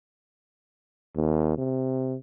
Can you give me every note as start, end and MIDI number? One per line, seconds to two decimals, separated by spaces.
1.16 1.55 39
1.58 2.16 48